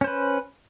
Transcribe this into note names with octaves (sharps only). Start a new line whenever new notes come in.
C#4 B4 C5